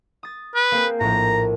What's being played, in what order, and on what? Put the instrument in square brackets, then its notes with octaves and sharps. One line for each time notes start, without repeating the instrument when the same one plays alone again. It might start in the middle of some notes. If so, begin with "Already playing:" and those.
[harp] D#6 A6
[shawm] B4
[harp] A#3 C4 G#4
[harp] A#1 A2 [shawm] A#5